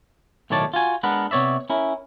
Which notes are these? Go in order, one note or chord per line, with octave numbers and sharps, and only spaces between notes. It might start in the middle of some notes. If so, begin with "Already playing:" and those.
B1 A2 D#3 C#5 D5 A5
F4 F#4 G#5
G#3 B3 D4 A#4 B4 F#5
C3 B3 C#5 D5 E5
C#4 E4 A#4